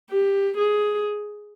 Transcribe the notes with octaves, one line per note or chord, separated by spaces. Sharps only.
G4
G#4